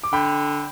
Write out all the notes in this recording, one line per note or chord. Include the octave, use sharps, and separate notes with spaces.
D6
D3 G5 B5